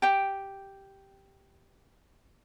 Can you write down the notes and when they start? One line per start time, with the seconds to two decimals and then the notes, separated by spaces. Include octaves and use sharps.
0.02 G4 G5